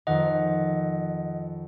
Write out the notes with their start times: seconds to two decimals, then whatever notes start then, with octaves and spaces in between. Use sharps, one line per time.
0.07 F2 D#3 D#5 F#5